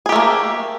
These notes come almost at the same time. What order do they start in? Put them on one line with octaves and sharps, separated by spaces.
G#4 G4 A3 A#3